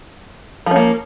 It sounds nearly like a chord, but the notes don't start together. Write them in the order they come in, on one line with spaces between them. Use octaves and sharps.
F3 C#4 A#3